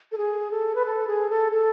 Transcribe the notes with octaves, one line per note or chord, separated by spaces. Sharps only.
A4
G#4
A4
B4
A4
G#4
A4
A4